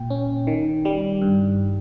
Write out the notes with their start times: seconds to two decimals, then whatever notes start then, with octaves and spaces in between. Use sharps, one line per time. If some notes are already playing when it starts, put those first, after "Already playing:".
Already playing: A#2 G5
0.10 C#4
0.47 D#3
0.85 G3
1.22 G2